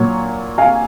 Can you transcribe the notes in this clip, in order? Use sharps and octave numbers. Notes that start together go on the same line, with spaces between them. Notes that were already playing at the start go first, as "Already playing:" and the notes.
Already playing: A#2 F#3 C#5
F5 G#5